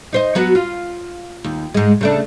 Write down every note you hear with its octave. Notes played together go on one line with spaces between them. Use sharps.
D#4 C5 D#5
F#3 B3 F#4
F4
D#2
G#2 G#3
C#3 A3 D4